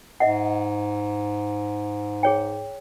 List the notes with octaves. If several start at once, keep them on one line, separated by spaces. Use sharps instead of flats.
G#2 D#5 E5 F#5
G#4 C#5 G5